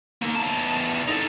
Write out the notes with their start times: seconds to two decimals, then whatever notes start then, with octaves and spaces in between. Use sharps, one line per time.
0.22 A#3 D#4
0.35 E2 A5
1.08 D#4 A4